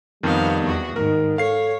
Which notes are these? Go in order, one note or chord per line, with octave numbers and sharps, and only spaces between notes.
F2 D#3 G3 B3 F5
E2 F#4
G#2 D#3 A#4
A4 C#5 F5 C7